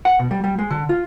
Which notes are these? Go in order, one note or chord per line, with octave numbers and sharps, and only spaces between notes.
F#5
B2
G3
G3
G#3
D3
F4